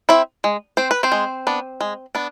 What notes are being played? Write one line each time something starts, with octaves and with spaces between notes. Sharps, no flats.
C4 E4 E5
G#3
C4 C5
B4
C4 C5
G#3
B3 D4
G#3
B3 D4